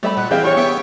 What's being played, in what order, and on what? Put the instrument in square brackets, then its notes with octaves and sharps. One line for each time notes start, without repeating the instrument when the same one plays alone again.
[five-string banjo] G3 E5 B5 [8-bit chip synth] A3
[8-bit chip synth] A#2 [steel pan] D#5 [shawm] F#5
[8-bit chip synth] E3 C4 [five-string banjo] E4 E5 [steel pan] G#4 F5 [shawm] G5
[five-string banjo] D4 C#5 [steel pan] G4 G#5 B5 [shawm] C#6
[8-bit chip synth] B3 E5 G5